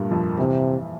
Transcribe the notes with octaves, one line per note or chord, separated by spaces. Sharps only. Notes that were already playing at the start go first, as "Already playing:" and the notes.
Already playing: G2 A#2 G3 A3 A#3
F2 F3
C3 E3